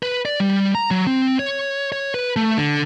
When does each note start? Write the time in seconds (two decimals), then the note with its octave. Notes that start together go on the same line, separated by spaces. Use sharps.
0.03 B4
0.25 D5
0.40 G3
0.75 A#5
0.91 F#3
1.07 C4
1.39 C#5
1.92 C#5
2.14 B4
2.36 A3
2.57 D3